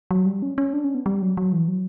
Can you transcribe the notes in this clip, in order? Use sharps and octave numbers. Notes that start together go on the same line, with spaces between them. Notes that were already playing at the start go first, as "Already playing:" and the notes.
F#3
G3
C#4
C#4
D4
C#4
B3
G3
F#3
F#3
E3
F#3